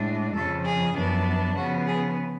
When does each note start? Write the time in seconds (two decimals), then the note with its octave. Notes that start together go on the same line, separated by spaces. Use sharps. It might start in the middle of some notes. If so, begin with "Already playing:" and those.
Already playing: A2 G#3 D4
0.35 F2 C#3 F3 A4
0.65 G#4
0.95 F#2 F3 B3 D4
1.56 C#3 F3 B3 F#4
1.86 G#4